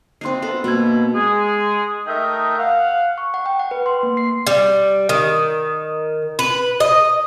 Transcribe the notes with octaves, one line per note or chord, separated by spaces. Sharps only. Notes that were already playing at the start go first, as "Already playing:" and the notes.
C4 D4 D#4 C6 C7
B3 A4
B2 A#3 B3 G#6
G#3 G#4
A3 D#4 A#4 D#5 E5 G5
F5 F#5
C#6
F#5
G5
F#5
B4
C6
A#3
C7
G3
D#3
B4
D#5